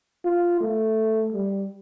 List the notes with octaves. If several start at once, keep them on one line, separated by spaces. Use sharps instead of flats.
F4
A3
G3